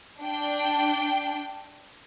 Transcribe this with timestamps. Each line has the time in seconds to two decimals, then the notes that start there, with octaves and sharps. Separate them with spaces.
0.20 D4 G5